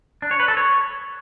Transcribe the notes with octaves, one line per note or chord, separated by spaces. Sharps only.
D4
C#5
B4
A4
C#5